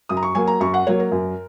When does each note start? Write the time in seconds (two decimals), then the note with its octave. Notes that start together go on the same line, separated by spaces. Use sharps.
0.09 F#2 D#6
0.17 A#5
0.23 C#6
0.35 F#3 A#3 G#5
0.47 A#5
0.60 F#2 C#6
0.74 F#5
0.87 F#3 A#3 C#5
1.00 A#4
1.11 F#2